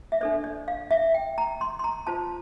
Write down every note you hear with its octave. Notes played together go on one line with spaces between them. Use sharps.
E5
D4 A4 C5 D5
D5
F5
E5
G5
A#5
C6
C6
A#5
F4 C5 A5